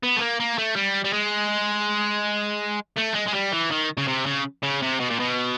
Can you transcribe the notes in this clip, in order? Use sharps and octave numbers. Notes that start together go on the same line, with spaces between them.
B3
A3
A#3
A#3
A3
G3
G3
G#3
A3
G#3
G#3
G3
E3
D#3
C#3
C3
C#3
C#3
C3
B2
A#2
B2